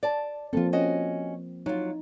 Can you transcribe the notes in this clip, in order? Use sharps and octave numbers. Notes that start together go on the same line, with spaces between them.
D5 A5
F3 A#3 C4 F4 A4
C#4 F#4 D#5
F#3 D#4 F4